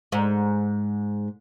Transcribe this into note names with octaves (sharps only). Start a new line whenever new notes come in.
G#2